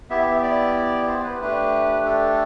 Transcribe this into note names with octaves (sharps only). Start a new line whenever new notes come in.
B3 E4 G4 E5
E5
D5
C5
B4
A3 D4 G4 B4
A4